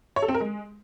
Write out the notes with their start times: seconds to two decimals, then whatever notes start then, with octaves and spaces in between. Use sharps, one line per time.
0.16 C#5
0.22 A4
0.28 C4
0.34 A#4
0.41 G#3